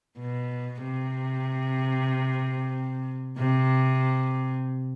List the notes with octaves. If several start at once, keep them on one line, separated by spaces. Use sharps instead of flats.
B2
C3
C3